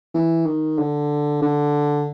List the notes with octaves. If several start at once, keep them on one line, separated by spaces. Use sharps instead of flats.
E3
D#3
D3
D3